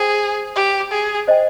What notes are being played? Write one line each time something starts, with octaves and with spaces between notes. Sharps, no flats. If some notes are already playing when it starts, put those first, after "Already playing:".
Already playing: G#4 C5 G5
G4
G#4
C5 D#5 G5